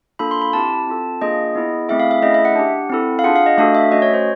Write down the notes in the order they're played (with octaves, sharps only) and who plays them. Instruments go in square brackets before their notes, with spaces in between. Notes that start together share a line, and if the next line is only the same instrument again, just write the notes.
[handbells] A#3 D4 F4 A4 B5
C6
B5
C4 E4 G4 A5
C4 F4 A4
A#3 D4 F4 G#4 D#5
B3 E4 G#4
A3 C4 E4 G#4 E5
F5
E5
A3 C#4 E4 G#4 D#5
E5
F#5
D4 G4
C4 E4 A4
F5
D4 F4 G#4 F#5
F5
D#5
A3 D4 F#4 A4 F5
E5
A3 C#4 F#4 D#5
C#5
C5